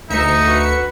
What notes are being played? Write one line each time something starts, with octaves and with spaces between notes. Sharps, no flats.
D2 D#4 E5 C#7
F#4 B4